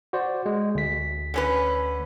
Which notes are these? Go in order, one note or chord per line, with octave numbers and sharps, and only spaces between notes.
F#4 C5 D5
G#3
D2 B6
D3 C#4 B4